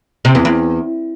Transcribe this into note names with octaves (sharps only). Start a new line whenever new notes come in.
C3
E2
E2